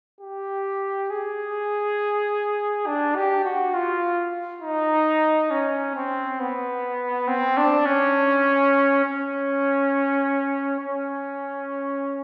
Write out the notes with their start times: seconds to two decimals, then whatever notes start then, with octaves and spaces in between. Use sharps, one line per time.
0.21 G4
1.10 G#4
2.87 D4
3.16 G4
3.44 F#4
3.74 F4
4.62 D#4
5.51 C#4
5.95 C4
6.40 B3
7.28 C4
7.57 D4
7.86 C#4
9.04 C#4
10.80 C#4